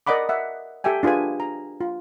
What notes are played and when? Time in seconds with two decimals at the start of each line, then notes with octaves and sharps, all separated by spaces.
0.07 A#4 D5 D#5 F#5 B5 D6
0.29 E5 F#5
0.84 G4 A4 E5 G5 G#5
1.03 D4 F4 G#4 B4 G#5
1.40 A#5
1.81 F4